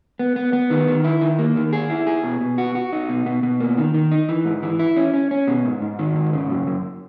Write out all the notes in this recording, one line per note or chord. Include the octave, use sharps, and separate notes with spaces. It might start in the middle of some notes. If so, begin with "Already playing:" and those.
B3
B3
B3
D#3
D#3
E4
D#3
A#3
D#3
G#4
E4
G#4
B2
B2
F#4
F#4
D#4
B2
B2
B2
A#3
D#3
D#3
D#4
E3
G#2
E3
E4
C#4
C#4
C#4
B2
G#2
G#2
D#3
G#2
C#3
F#2
F#2